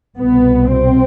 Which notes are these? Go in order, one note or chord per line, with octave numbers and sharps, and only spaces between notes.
C2 B2 B3
C4